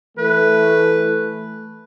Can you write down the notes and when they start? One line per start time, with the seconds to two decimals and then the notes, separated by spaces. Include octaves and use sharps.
0.18 E3 A3 B4